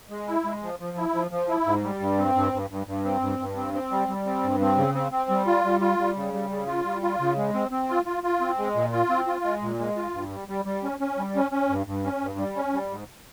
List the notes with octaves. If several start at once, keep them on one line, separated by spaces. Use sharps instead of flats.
G#3
E4
G#3
F3
F3
E4
F3
F3
E4
G#2
G3
G2
C4
G2
G2
G2
G2
C4
G2
G2
C4
C4
G3
G3
C4
G2
C4
C#3
C4
C4
G3
F4
G3
F4
G3
C#3
G3
C#3
F4
G3
F4
C#3
G#3
C4
C4
F4
F4
F4
C4
G#3
A#2
F4
C4
F4
G#3
A#2
G#3
F4
G2
G3
G3
G3
C#4
C#4
G3
C#4
C#4
G2
G2
C#4
G2
G3
C#4
G3
G#2